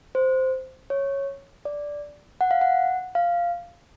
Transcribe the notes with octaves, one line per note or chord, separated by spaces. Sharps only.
C5
C#5
D5
F#5
F5
F#5
F5